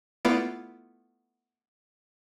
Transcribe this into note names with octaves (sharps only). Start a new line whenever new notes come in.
A3 B3 E4 F4 B4 D5